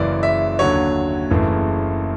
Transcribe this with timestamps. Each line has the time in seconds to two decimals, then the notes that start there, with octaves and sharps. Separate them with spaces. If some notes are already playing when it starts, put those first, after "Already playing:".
Already playing: F#1 F#2 C#3 E3 D5
0.23 E5
0.59 D#2 D3 F#3 C#5
1.31 F#1 F#2 C#3 E3 A3